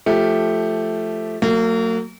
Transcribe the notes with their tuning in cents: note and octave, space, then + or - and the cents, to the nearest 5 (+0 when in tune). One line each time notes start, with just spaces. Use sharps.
F3 -5 A3 -5 G4 +0
F#3 +0 A#3 -40